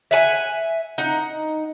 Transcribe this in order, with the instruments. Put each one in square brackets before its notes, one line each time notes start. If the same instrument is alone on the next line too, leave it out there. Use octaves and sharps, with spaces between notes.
[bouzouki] E5 F#5 G#5
D#4 F#5